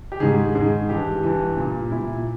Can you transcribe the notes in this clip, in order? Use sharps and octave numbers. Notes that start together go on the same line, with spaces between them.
G4
G#2 D#3 G#4
G#2 D#3 G#4
G2 E3 G4
G2 E3
A#2
A#2 E4